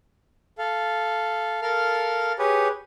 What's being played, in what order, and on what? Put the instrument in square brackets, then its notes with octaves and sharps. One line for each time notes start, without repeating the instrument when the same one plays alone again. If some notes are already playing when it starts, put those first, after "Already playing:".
[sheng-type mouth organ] A4 F5
A4 A#4 F5 F6
G4 G#4 B4 C#5